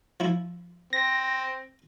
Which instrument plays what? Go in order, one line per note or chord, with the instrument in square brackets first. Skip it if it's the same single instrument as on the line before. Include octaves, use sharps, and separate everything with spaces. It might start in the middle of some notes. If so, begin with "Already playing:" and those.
[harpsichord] F3 E4
[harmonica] C4 [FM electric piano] A#6